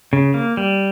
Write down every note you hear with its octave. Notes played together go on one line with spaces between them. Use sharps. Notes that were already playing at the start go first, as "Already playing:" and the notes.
C#3
A#3
G3